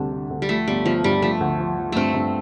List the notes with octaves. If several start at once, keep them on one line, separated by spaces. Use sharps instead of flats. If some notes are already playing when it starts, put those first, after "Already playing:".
Already playing: D2 C3 G3 D4
D3
D2
G3
F3 A3
G1 G3
G1 F3
G2 G3
F3 A3
D2
F3
F3
G2 A3 C4
G2